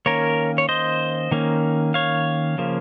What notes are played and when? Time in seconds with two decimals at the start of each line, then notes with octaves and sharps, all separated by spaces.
0.06 D#3 A#3 C#4 A#4 C#5
0.58 C#5
0.69 C5 D#5
1.31 D#3 A#3 C#4
1.94 C#5 F5
2.58 C#3 F3 A#3